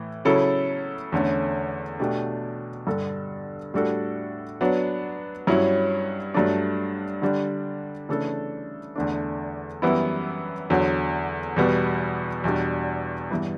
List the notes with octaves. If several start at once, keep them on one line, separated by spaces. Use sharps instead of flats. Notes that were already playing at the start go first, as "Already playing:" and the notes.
Already playing: A2 E3
C#3 F#3 C#4 E4 A4
E2 D3 A3 C#4
B2 A3 D4 G4
G2 D3 G3 D4 A4
A2 G3 D4 F#4 A4
F#3 B3 D4
G2 F#3 C#4 E4
G2 F#3 A3 D4
D3 G3 D4
C#3 E3 A3 D4 A4
E2 D3 A3 D4
F#2 E3 G3 B3 E4
E2 D3 F#3
E2 B2 G3 B3
E2 B2 G3 D4
G2 E3 B3